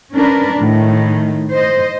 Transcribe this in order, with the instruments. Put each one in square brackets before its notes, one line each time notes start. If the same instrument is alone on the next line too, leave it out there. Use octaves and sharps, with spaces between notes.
[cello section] C#4 D4 A#4 B4
A2 D#3
C5 D#5